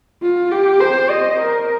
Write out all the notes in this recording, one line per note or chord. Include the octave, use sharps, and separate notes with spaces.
F4
G4
C5
D#5
A#4